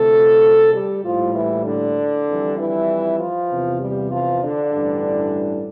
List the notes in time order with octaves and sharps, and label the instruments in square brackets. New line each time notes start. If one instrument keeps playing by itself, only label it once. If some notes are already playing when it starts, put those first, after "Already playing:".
Already playing: [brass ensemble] D2 C3 F3 A3 A4
G3 G4
A#1 A2 F3 G3 F4
E3 E4
D3 D4
F2 E3 G3
E3 E4
F3 F4
E2 C3 E3
G3 G4
F3 F4
D3 D4
A1 G2 E3 G3